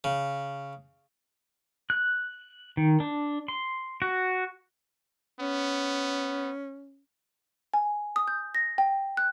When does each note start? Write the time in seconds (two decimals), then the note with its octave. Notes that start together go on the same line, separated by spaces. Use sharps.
0.04 C#3
1.90 F#6
2.77 D#3
3.00 D4
3.48 C6
4.02 F#4
5.40 B3 C#4
7.74 G#5
8.16 D#6
8.28 G6
8.55 A#6
8.78 G5
9.17 F#6